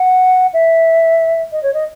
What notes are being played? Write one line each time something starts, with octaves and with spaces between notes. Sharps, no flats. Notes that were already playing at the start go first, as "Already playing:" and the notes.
Already playing: F#5
E5
D#5
C#5
D#5